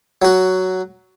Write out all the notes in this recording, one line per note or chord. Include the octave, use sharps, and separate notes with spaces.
F#3 F#4